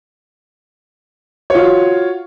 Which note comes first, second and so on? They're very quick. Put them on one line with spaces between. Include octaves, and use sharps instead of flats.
C#5 F#4 F4